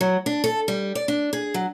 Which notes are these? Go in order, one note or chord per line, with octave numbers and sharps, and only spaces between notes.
F#3
D4
A4
G3
D5
D4
G#4
F#3